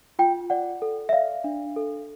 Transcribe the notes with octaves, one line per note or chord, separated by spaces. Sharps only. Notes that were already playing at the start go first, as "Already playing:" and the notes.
F4 G5
D5 F#5
A4
E5
D5 F5
D4
A4